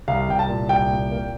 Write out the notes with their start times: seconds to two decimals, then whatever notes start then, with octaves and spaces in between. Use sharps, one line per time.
0.08 C2 F5
0.28 C2 G5
0.39 A5
0.48 A#2
0.69 C2 G5
0.91 A#2
1.11 A#3